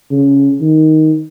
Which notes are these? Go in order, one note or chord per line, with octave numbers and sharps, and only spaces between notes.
C#3
D#3